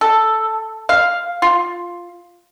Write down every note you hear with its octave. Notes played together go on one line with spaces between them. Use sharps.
A4
F5
F4